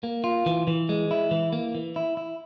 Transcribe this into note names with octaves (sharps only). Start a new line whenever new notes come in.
A#3
F4
E3
E3
G#3
E4
E3
A#3
E3
E4
E4